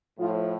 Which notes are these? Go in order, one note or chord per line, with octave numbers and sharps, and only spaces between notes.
A2 F3 F4